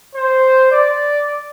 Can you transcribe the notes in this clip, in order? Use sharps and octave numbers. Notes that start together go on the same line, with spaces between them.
C5
D5